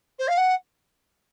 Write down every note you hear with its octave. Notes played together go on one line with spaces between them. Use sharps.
C5
F5
F#5